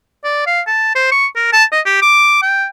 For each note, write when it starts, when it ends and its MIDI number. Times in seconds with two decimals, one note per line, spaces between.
0.24 0.46 74
0.47 0.61 77
0.67 0.92 81
0.95 1.11 72
1.12 1.26 85
1.36 1.50 70
1.52 1.64 81
1.72 1.80 75
1.86 1.98 67
2.02 2.37 86
2.42 2.65 79